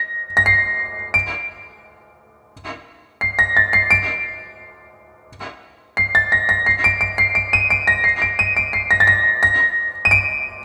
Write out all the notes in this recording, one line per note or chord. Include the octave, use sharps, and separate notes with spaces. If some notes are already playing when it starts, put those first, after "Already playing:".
Already playing: A#6
A#6
C7
D7
C7
A#6
A6
C7
D7
C7
A6
A#6
A#6
C7
D7
D7
C7
D7
D#7
D7
A#6
C7
D7
D#7
D7
C7
A#6
A6
A#6
A#6
D#7
D7